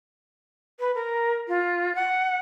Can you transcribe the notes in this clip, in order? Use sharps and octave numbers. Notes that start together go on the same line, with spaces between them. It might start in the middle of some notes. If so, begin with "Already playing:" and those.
B4
A#4
F4
F#5